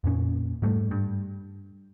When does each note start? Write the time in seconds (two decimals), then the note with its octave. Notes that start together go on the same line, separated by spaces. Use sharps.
0.04 F2 A#2 C#4
0.62 G#2 G3 A3
0.91 G2